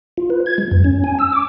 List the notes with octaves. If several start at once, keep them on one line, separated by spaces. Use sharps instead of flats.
F4
B4
G#6
G#3
F#2
C#4
G#5
E6
D6